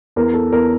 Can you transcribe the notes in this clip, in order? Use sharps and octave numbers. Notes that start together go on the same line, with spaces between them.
E2 A#4
A4
E2 A#4